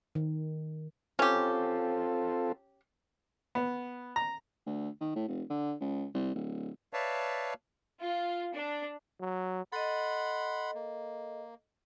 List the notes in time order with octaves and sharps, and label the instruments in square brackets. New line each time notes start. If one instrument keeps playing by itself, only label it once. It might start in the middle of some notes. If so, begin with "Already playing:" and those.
[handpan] D#3
[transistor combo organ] C4 F4 A4 [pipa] C#4 G4
[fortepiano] B3
A#5
[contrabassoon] D2
D#3
A2
F1
D3
C#2
C2
D1
[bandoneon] B4 C#5 D5 E5 F5 A5
[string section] F4
D4
[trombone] F#3
[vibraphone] A4 D#5 [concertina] F#5 B5 C6
[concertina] A#3